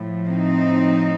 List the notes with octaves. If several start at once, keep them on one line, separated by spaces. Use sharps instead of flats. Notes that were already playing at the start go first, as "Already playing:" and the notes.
Already playing: A2 F3
C4 D#4